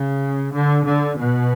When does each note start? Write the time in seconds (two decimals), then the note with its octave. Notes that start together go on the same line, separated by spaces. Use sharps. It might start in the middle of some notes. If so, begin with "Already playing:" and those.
Already playing: C#3
0.53 D3
0.85 D3
1.17 B2